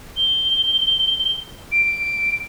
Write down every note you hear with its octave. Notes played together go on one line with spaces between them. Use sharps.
G7
D7